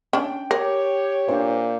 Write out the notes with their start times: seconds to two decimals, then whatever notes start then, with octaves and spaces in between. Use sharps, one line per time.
0.13 C#4 D4 G5
0.51 G4 A#4 C#5
1.28 A#2 D4 C5